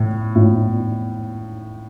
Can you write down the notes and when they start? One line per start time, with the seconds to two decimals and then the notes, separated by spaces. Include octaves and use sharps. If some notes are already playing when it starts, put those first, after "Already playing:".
Already playing: A2
0.35 A2